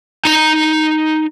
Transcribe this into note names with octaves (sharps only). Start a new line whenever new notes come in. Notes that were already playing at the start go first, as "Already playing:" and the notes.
D#4 A#5